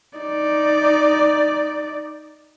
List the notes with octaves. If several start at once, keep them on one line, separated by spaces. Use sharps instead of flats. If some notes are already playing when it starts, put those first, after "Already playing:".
D#4 D5